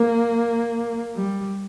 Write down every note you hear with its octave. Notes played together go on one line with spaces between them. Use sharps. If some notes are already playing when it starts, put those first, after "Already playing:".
Already playing: A#3
G3